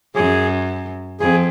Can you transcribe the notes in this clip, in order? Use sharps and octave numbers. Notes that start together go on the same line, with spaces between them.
F#2 G#4
F2 G#4